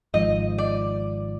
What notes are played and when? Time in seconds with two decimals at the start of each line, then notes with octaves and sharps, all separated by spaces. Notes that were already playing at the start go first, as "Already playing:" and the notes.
0.14 G#1 G#2 F3 D#5
0.58 D5